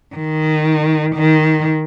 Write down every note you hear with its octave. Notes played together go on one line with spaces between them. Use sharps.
D#3
D#3